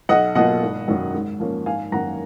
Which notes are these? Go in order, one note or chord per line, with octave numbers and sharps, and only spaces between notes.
B1 D#5 F#5
B2 F#3 A#3 F4 D#5 F#5
G#1
F#2 D#3 F#3
G#2
F3 A#3 C#4
G#1 F5 G#5
F#2 D#3 A#3 F#5 A#5